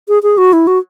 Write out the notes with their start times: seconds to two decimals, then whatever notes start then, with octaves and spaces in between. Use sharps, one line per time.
0.08 G#4
0.23 G#4
0.37 F#4
0.53 E4
0.67 F#4